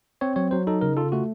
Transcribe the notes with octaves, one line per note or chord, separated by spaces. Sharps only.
C4 C#5
F#3 C#5
F#3 C5
D#4 A4
C#3 A#4
F4 A4
A3 F#4